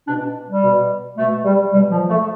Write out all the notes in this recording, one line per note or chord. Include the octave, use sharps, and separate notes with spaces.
B2 D4
G3
B2
B2 A3
G3
B2 G3
F3
A3